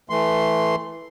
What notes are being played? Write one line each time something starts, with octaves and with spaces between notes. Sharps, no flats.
E3 A3 C6